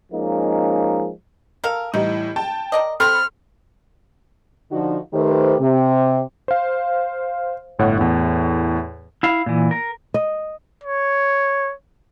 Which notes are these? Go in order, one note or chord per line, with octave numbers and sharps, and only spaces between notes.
F3 G#3 A#3 C#4 D#4
A4 A#4 F5
A2 E3 G3 D#4
G5 A5
A#4 D5 D#5
C4 A4 B5 C6 F6
D3 F3 D#4 F#4
D#3 A3 G4 B4 C5
C3
C5 F5
G1 A2 C#5 F#5
E2 A2
E4 F5
A#2 E3
A#4
D#5
C#5